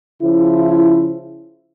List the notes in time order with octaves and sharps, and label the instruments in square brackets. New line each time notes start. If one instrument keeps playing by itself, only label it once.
[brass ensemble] C#3 F3 E4